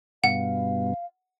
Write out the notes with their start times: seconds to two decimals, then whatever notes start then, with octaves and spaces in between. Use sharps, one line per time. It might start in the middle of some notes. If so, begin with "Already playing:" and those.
0.24 G2 B2 F5 F#5